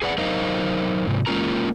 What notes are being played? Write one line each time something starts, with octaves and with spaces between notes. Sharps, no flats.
G#4 B4 D5 F#5
F#3 D#4 A#4 C5 D#5 F5
G#2 C3
G#3 A#3 C#4 F4 A#4 A#5